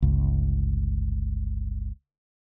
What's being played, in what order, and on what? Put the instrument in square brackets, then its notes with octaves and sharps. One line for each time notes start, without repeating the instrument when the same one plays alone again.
[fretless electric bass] G1 C#2